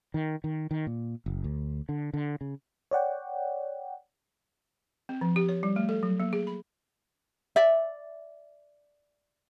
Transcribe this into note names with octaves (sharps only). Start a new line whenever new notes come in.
D#3
D#3
D#3
A#2
F#1
D2
D3
D3
C#3
C#5 D5 F#5 G5
C4
F3
G4
C#5
G3
A3
A4
F#3
A#3
G#4
B5
D5 E5